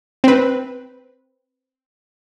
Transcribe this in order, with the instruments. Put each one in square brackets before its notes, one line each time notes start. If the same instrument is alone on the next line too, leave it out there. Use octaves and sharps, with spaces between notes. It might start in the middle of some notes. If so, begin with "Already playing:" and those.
[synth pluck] C4 B4